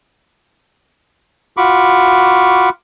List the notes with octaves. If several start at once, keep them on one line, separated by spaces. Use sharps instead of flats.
F4 F#4 B5 C#6 D6